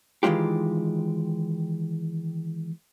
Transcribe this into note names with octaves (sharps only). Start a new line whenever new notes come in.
D#3 E3 G#3 F4 G4